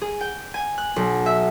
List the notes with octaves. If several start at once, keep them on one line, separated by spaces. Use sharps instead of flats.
G#4
G5
G#5
F#6
B1
E5